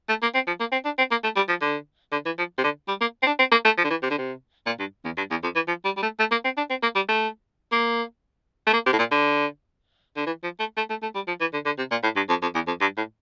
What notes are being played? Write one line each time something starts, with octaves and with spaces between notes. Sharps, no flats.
A3
A#3
C4
F3
A#3
C4
D4
C4
A#3
A3
G3
F3
D3
D3
E3
F3
C3
D3
G3
A#3
C4
D4
C4
A#3
A3
F3
D3
E3
C3
D3
C3
A#2
G2
E2
G2
E2
F2
E3
F3
G3
G3
A3
A3
A#3
C4
D4
C4
A#3
G3
A3
A#3
A3
A#3
C3
A2
A#2
D3
D3
E3
F3
A3
A3
A3
A3
G3
F3
E3
D3
D3
C3
A#2
A2
G2
F2
F2
E2
F2
G2
A2